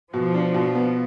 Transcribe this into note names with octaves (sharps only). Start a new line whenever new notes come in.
B2 F3
D4
B2
B3